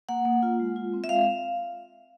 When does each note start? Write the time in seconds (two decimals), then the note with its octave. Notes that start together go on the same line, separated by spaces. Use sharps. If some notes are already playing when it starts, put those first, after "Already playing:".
0.09 A#3 F#5
0.25 A#3
0.43 F4
0.60 G#3
0.76 F4
0.93 C4
1.04 E5
1.09 G#3 F5